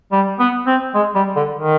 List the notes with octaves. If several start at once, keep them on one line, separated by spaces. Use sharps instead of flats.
G3
B3
C4
G#3
G3
D3
D#3